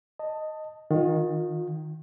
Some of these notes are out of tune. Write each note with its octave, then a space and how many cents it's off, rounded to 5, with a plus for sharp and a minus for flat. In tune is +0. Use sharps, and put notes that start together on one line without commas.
D#5 +0 A5 +15
D#3 +0 F4 +35